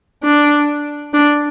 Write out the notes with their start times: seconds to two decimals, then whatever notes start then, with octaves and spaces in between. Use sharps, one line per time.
0.24 D4
1.14 D4